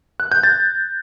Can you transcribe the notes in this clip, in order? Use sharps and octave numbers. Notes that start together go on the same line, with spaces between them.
F#6
G6
A6